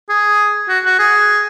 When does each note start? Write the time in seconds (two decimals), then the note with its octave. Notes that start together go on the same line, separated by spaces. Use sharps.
0.09 G#4
0.68 F#4
0.85 F#4
0.99 G#4